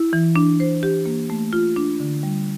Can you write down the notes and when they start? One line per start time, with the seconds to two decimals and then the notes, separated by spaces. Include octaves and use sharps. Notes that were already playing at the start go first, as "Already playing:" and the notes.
Already playing: E4
0.13 E3
0.36 D4
0.60 C5
0.83 G4
1.06 A#3
1.30 A3
1.53 F4
1.76 D4
2.00 D3
2.23 G3